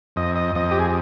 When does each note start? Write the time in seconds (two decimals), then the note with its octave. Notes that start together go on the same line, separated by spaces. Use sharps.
0.16 F2 D#5
0.36 D#5
0.55 F2 D#5
0.71 G4
0.79 G#4